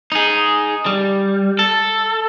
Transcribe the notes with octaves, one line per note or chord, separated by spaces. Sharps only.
D#4 G#4
G3
A4